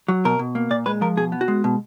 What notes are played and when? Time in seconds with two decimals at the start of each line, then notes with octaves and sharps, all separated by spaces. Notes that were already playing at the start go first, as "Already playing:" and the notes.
0.08 F#3
0.25 B2 A#4
0.39 B2
0.55 A#3
0.71 A#2 D5
0.86 G#3 B4
1.01 F3 A#4
1.17 B2 G#4
1.32 B3
1.41 F#4
1.48 G#3
1.64 B2